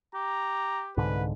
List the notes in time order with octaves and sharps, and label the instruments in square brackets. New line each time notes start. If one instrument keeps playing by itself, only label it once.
[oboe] G4 [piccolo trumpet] A#5
[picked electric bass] C2 G#2 D3 [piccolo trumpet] B4